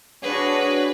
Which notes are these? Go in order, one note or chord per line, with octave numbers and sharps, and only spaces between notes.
D4 F#4 G#4 B4 C#5